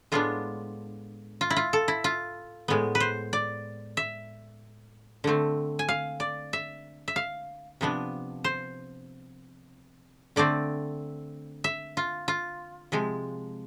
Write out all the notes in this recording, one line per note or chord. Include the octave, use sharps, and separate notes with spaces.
A2 G#3 B3 D4 F4
F4
E4
F4
A4
E4
F4
A2 G#3 B3
B4
C5
D5
E5
D3 A3 C4
G#5
F5
D5
E5
E5
F5
C3 F3 B3 D4
C5
D3 A3 C4 D5
E5
F4
F4
C3 F3 G#3